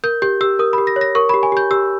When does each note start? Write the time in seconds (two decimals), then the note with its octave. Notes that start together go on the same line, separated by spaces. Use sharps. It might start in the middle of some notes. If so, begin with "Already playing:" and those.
0.04 A#4 G6
0.22 G4 G6
0.41 G4 E6
0.59 A#4 D#6
0.73 B5
0.78 G4
0.87 A#6
0.96 C#5
1.01 A#6
1.15 A#4 C#6
1.29 G4 B5
1.43 G#5
1.52 G4 G6
1.71 G4 E6